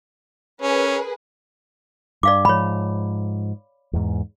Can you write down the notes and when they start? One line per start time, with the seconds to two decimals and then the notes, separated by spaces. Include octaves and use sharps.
0.62 C#4 G#4 A#4 B4
2.23 G2 D5 F5 D6
2.45 G#2 F3 C#5 B5
3.93 E2 G#2